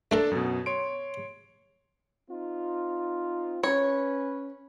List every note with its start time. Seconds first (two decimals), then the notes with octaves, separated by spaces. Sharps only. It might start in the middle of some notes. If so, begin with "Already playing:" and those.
0.11 A3 D4 A4 A#4 A5 A#5
0.31 F#2 B2
0.66 C#5 C6 D7
2.30 C4 D#4 F4
3.63 C#4 B4 C#5